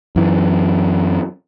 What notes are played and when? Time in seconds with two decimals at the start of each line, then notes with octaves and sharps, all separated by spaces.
0.16 F#2 E3